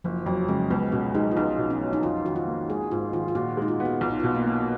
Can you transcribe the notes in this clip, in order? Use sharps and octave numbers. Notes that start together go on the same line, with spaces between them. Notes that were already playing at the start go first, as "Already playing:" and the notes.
F#1 F3
F2 F#3
C#3 G#3
C#2 B3
B2 C#4
G#3 D#4
F4
B1 D#4
B2
C#4
F#3
D#4
F2 F4
D#3 F#4
F4
A#3
G#1 G#4
G#2 F4
D#3 F4
F4
A#2 F#4
G#3 D#4
F4
B3
F#4
B1 F4
D#4
F4
B2
A#3
A#3